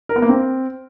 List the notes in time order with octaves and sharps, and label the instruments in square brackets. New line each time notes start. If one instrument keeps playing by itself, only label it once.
[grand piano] A#4
B3
A#3
C4